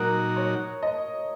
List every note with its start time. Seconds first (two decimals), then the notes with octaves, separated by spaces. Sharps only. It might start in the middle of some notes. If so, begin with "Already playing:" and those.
Already playing: A#2 F#3 D#4 F#4 A#4
0.36 C#5
0.83 D#5